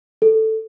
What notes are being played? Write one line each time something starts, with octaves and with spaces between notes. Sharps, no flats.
A4